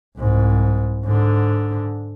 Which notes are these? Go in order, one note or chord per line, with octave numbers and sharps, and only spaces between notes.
C2 G#2
G#2 D3